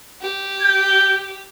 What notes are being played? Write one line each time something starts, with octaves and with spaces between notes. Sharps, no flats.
G4
G6